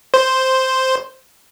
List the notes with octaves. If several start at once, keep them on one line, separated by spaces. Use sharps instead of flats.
C5